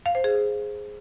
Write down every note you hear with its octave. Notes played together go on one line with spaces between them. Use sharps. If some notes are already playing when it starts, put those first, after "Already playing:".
F5
C5
G#4